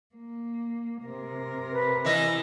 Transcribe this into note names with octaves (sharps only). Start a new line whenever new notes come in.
A#3
C3 A#4
B4
E3 E4 D#5 E5